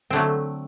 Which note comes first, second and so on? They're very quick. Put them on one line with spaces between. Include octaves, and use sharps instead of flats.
C4 D3 A3 F#3